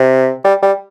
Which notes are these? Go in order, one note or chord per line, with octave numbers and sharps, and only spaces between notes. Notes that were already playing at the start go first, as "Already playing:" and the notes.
Already playing: C3
G3
G3